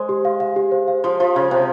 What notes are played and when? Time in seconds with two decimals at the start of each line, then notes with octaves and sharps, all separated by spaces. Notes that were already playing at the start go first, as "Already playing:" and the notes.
Already playing: G#3 C5 C6
0.09 G4
0.25 F5
0.40 F5
0.56 G4
0.72 C5
0.88 F5
1.04 F3 C6
1.20 F3 F5
1.35 C#3 F5
1.51 C3 C5